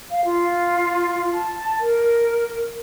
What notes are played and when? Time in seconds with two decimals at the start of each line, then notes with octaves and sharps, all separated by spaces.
0.11 F5
0.25 F4
1.33 A5
1.80 A#4